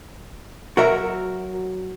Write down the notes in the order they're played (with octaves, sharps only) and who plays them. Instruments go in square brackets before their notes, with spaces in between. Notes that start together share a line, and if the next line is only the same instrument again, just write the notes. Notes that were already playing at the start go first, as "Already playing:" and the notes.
[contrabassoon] F#3 [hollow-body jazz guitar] F#4 A#4 E5